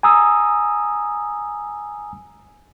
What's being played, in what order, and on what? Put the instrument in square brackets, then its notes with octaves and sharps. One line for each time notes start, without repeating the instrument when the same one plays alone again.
[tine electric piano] G#5 A#5 D#6 E6